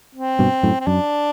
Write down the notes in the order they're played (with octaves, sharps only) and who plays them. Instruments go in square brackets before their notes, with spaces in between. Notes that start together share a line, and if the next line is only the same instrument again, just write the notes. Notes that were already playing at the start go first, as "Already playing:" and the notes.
[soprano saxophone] C4
[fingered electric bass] G2 B2
F#2 A2
[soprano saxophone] C4
[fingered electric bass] F#2 [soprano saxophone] D4